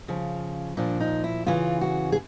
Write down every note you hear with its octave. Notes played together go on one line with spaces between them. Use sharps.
C#3 F3
A#2 F3 D4
D#4
E4
C#3 E3 F4
F#4
G#4